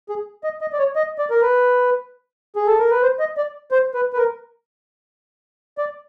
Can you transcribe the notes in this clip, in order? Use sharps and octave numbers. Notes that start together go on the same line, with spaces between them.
G#4
D#5
D#5
D5
C#5
D#5
D5
A#4
B4
G#4
A4
A#4
B4
C5
D#5
D5
C5
B4
B4
A#4
D5